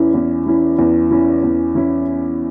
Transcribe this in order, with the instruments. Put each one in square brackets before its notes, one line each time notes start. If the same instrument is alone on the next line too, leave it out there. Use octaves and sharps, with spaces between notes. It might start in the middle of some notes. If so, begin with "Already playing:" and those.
Already playing: [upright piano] E2 E3 C#4 E4
E2
E3 C#4 E4
E2
E3 C#4 E4
E2
E3 C#4 E4